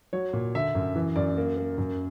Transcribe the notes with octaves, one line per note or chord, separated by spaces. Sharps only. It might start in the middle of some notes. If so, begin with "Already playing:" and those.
F#3 C#5
A#2
D3 E5
F#2
E3
F#2 D5
A#3
A#3
F#2